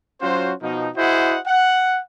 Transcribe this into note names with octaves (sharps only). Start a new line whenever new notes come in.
F#3 C#4 F4 F#4 C5
B2 F3 D#4
E4 F#4 G#4 C5 D#5 F#5
F#5